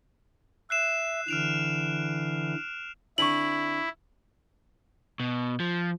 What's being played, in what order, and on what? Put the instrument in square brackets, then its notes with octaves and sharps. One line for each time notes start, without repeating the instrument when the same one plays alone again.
[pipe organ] E5 [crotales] F#6 C7 E7
[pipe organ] D3 E3 [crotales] F6 D7 F7
[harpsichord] D3 C4 D4 [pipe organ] E4 [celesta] C#6 F#7
[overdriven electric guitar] B2
F3